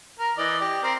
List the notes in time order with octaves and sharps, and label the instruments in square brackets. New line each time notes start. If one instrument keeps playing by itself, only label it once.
[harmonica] A#4
E3 D5 D#5
G4
C4 A#4 C5